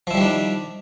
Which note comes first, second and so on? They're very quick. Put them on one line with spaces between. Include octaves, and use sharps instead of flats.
F3 E4 G3 D#3 D4